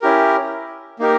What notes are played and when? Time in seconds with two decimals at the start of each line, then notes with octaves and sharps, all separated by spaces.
0.02 C#4 E4 G4 A#4
0.99 A#3 D#4 G4 A#4